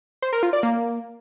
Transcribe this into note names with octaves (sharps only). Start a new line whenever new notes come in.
C5
A#4
F4
D5
A#3